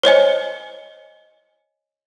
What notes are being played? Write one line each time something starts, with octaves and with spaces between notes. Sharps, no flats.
C5 C#5 D#5 G#5